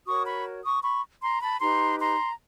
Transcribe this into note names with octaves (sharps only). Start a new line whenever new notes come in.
F#4 A#4 C#5 C#6 D#6
B5 C#6
C#6 D#6
B5 C#6
A#5 C6
A5 B5
D#4 G4 B4 A#5 C6
A#5 C6